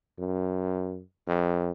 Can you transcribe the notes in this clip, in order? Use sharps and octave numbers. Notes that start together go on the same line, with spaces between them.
F#2
F2